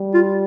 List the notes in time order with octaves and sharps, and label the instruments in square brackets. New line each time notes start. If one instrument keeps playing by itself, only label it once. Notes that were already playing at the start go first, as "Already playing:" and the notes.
Already playing: [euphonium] G3
[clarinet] F4